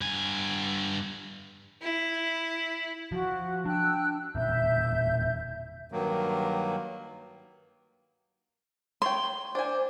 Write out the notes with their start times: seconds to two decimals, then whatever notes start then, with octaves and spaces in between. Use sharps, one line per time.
0.01 G2 G#5
1.82 E4
3.12 F3 F#4
3.66 D4 G5 E6 F#6
4.35 E1 A#2 E5 G6
5.92 G2 D#3 F#3 A#3
9.02 C#5 G5 C6
9.55 D4 C5 G#5